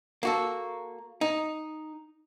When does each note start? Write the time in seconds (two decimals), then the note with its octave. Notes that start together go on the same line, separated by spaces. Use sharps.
0.23 A#3 F#4 A4
1.21 D#4